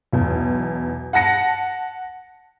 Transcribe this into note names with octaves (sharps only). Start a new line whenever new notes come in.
B1 E2
F#5 A5 A#6 C#7